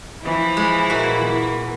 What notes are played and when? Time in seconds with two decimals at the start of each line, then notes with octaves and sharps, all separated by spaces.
0.24 E3 F3 E4 B5
0.57 G#3
0.90 A#2 F#4
1.25 E3